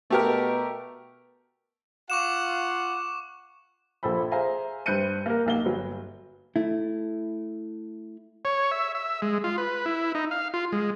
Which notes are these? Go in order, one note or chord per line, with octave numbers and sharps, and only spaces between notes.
B2 A3 G4 A#4
F4 F5 F#5 C#6 D6 E7
A#1 A#2 A4 C5 B5
G#4 C5 E5 F5 G#5 A#5
G2 C5 F#6 G6 C#7 D#7
A#3 A#4
B1 A#3 G7
G1 F#3
A3 E4
C#5
E5
E5
G#3
F4
B4
E4
D#4
F5
F4
G#3